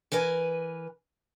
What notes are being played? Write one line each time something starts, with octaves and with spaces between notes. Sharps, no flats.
E3 A#4 B4 G#5